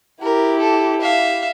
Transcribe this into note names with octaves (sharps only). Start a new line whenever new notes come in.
E4 G4 A#4
A4
E5 F5